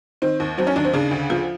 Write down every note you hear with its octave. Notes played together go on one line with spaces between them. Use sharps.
D#3 C4
D#2
F#3 C4
C#4
D#2 D4
C4
C#3 D4
D2
F3